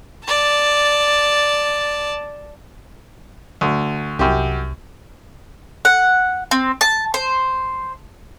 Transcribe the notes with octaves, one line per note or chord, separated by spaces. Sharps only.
D5 A5
D2
C2 F#2 G4
F#5
C4
A5
C5